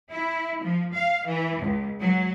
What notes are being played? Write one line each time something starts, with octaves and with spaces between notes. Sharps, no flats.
E4
F3
F5
E3
C#2
F#3